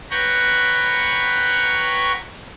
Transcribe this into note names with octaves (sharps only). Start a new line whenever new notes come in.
B4 C#5 F#5 G5 A#5 C#6